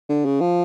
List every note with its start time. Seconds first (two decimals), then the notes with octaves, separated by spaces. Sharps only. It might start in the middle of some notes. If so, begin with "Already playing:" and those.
0.09 D3
0.25 C#3
0.41 F3